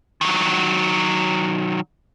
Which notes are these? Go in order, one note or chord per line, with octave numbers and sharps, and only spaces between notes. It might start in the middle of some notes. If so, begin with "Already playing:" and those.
D#3 F#3